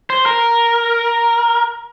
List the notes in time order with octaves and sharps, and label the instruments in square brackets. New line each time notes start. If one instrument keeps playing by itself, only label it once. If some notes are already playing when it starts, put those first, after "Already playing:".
[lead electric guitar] C5
A#4